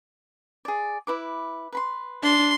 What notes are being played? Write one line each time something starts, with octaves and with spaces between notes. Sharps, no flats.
G#4 D5
E4 B4 D6
B4 B5 C6
D4 C6